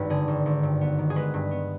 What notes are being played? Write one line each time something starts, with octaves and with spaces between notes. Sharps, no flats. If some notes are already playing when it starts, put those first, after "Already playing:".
Already playing: G#1 G2 B4
D3 G#4
G#1
G#1
G2
B3
D#3
G#4
G#3 B4
G2
B3